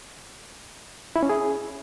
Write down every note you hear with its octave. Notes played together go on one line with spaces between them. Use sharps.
E4
C#4
G#4